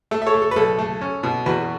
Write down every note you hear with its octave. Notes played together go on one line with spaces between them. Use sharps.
A3 A4
E5
A4 C#5
A3
A4
B4
B1 A4
A3
C#4
B2
E2 F#4 B4